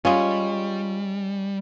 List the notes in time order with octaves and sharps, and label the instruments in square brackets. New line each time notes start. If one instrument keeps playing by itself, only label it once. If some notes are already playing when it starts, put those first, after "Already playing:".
[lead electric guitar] G3 [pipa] G#3 C#4 [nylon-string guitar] F4